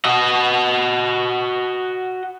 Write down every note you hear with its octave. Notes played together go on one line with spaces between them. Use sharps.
F#4 D#5